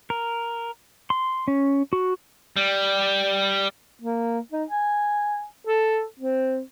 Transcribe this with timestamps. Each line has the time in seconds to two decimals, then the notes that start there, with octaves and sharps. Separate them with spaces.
0.10 A#4
1.10 C6
1.48 C#4
1.93 F#4
2.57 G3
4.02 A#3
4.52 D#4
4.69 G#5
5.67 A4
6.19 C4